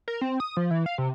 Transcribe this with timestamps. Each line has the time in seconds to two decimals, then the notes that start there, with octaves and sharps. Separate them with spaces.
0.08 A#4
0.21 C4
0.40 D#6
0.57 F3
0.71 E3
0.86 F5
0.98 C3